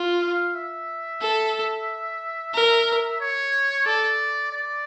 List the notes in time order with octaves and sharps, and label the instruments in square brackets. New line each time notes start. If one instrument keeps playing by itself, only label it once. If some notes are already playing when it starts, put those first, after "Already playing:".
Already playing: [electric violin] F4
[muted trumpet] F5
E5
[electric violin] A4
A#4
[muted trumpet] C#5
[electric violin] A4 [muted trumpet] D5
[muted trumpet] D5